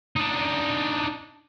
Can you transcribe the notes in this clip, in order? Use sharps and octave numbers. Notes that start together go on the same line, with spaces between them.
D4 D#4